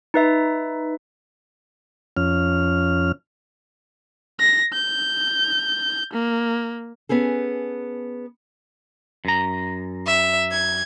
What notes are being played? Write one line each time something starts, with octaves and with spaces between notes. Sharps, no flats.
D#4 B4 E5
F2 C#4 F6
A#6
G6
A#3
B3 C#4 G#4 A4
F#2 A#5
E5
G#6